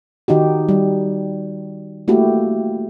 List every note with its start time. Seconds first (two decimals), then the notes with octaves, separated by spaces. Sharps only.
0.28 D#3 D#4 F#4 G4
0.69 G3
2.08 A3 A#3 E4 F#4 G4